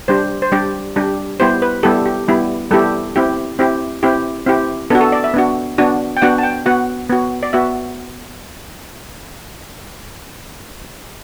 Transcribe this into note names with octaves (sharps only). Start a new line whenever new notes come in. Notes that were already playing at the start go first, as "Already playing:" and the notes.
G3 D4 G4 C5
C5
G3 D4 G4 D5
G3 D4 G4
G3 B3 E4 G4 C5
B4
G3 B3 E4 G4 A4
G4
G3 B3 E4 G4
G3 B3 E4 G4 A4
C4 E4 G4
C4 E4 G4
C4 E4 G4
C4 E4 G4
B3 D4 F#4 A4
A4
D5
E5
B3 D4 F#4
B3 D4 F#4
G5
B3 D4 F#4 F#5
A5
G5
B3 F#4 F#5
B3 F#4
D5
B3 F#4 E5